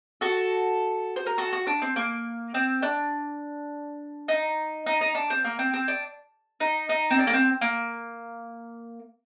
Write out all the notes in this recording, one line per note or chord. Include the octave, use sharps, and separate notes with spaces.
F#4 A4
C5
A#4
F#4 A4
F#4
D4
C4
A#3
C4
D4
D#4
D#4
D#4
D4
C4
A#3
C4
C4
D4
D#4
D#4
C4
D4
A#3
C4
A#3